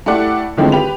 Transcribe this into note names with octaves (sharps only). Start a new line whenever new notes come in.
A3 E4 G4 D5 F#5
D3 D#3 G#3 A3 B3 C4
G4 B4 F7